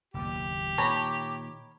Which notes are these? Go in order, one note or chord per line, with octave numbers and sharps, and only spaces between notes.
F#1 D#2 B2 G4
A#2 D#3 C#5 A#5 B5